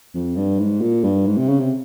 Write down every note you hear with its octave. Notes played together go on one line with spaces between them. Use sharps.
F2
G2
G#2
A#2
G2
G#2
C3
C#3
C3